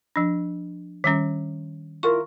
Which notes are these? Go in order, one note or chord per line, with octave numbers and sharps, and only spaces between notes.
F3 D4
D#3 G3 C#4
E4 F4 A#4 C#6